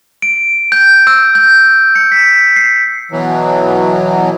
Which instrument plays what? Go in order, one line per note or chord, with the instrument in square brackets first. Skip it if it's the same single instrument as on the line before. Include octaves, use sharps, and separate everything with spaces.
[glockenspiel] D7
G6
E6
G6
C#7
B6
C7
[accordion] B2 E3 F#3